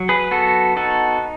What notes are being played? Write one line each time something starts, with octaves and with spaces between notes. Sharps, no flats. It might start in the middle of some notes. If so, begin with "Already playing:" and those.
Already playing: F#3
G#4 B4
B3 F#4 A4
D#4 F#4 A4